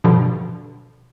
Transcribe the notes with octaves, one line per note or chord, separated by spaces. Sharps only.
G2 B2 D3 F3